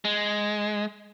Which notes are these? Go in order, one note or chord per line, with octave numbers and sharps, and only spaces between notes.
G#3